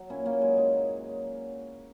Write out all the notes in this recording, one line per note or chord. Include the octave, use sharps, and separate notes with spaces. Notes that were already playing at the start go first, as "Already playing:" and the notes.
Already playing: F#3
A#2 C#4 E4
A#2 A#3 C#4
F#3 G#3
F#2 G#3
F#3